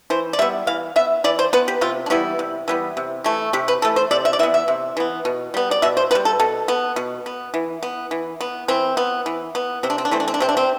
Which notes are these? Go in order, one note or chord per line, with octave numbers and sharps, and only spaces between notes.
E3 C5
D5
G3 B3 E5
E3 F5
B3 E5
E3 D5
C5
B3 B4
G4
C3 F4
D4
E3 G3 B3 E4
C3
E3 G3 B3
C3
E3 A3
C3 G4
B4
E3 A3 A4
C5
C3 D5
E5
D5
E3 B3 E5
E5
C3
E3 B3
B2
G3 B3
D5
B2 E5
C5
B3 B4
G3
A4
B2 A4
B3
B2
B3
E3
B3
E3
B3
E3 C4
B3
E3
B3
C3 C4
D4
C4
D4
E3 A3 C4
D4
C4
D4
C3 C4
D4
C4